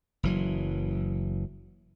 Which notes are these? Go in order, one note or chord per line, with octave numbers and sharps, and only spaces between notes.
F#1 E3 F#3